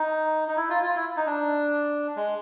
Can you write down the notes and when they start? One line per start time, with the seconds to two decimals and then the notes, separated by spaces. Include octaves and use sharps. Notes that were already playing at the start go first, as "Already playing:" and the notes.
Already playing: D#4
0.48 D#4
0.57 E4
0.70 F4
0.83 F4
0.96 E4
1.17 D#4
1.27 D4
2.16 G#3